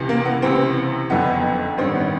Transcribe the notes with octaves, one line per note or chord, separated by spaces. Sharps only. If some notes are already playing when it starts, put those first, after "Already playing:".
Already playing: C#2 C3 E3
A#3
B3
C#2 C3 E3 C4
F#1 F2 D3 B3
A1 G2 D#3 C4
B3